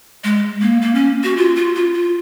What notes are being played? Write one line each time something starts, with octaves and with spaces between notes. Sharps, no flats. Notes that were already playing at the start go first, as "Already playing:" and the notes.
G#3
A#3
A#3
C#4
F#4
F4
F4
F4
F4